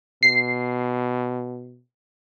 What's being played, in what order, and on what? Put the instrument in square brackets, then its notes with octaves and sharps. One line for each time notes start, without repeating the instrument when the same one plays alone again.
[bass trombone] B2 [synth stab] C7